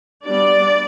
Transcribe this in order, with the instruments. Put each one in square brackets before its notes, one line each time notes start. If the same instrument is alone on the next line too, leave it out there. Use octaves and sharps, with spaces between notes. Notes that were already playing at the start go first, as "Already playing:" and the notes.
[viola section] G3 B3 D4 D5